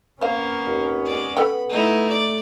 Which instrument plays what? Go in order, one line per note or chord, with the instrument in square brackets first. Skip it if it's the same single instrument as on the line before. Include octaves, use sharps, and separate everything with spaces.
[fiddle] A#3 [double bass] B3 C#4 [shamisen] C5 F5
[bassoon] D#2
[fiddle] G#3 D5
[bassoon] B3 [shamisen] A4 B4 G5 [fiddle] B5
[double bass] A3 [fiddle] D#4 E4
[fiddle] D5